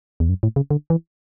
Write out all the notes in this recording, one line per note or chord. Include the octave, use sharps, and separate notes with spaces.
E2
F#2
A2
C#3
D3
E3